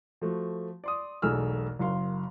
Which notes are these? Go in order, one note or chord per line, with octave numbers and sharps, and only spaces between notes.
F3 A3 F#4
D5 C6 D#6
E1 B1 A3 G#4 E6 F6
F#1 F#2 F5 C6